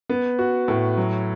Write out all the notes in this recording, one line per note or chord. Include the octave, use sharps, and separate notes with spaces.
B3
F#4
A2
F#3